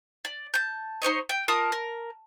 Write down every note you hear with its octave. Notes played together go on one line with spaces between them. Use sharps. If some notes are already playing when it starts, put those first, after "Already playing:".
D5
A5 G6
D#4 C5 C#5 D#5
G5
F4 A#4 A5 D#6
A#4